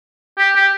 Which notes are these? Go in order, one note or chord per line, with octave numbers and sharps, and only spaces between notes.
G4
G4